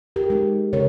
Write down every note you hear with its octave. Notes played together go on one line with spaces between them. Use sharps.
G4 A#4
G#3 D#4
C#3 A#4 C#5